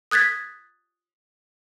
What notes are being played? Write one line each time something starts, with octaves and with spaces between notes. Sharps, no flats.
D#6 F#6 G#6 A6 B6